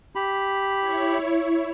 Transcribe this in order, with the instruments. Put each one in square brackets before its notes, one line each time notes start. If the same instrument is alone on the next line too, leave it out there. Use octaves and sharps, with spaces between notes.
[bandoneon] G4 B5
[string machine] E4 C#5